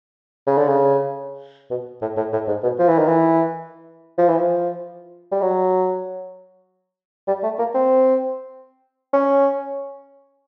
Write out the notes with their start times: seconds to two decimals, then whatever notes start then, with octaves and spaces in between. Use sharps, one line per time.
0.47 C#3
0.58 D3
0.69 C#3
1.71 B2
2.02 A2
2.17 A2
2.33 A2
2.48 G#2
2.63 B2
2.79 F3
2.89 E3
2.99 D#3
3.08 E3
4.18 F3
4.28 E3
4.38 F3
5.32 G3
5.42 F#3
7.28 G3
7.43 A3
7.59 A#3
7.74 C4
9.13 C#4